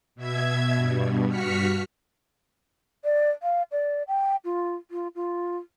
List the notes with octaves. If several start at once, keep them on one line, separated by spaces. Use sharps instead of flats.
B2 E5 G#6
G2 B2
G2 F#4 F6 B6 C#7
D5
F5
D5
G5
F4
F4
F4